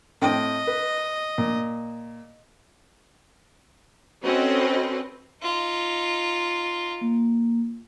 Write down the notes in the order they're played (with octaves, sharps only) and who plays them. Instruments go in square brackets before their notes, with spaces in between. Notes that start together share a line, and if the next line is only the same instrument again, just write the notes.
[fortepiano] A2 C4 G5 [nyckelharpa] D#5
[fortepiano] B4
A#2
[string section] C4 C#4 F#4 A4 B4 D#5
[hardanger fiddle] D#4 F4
[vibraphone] A#3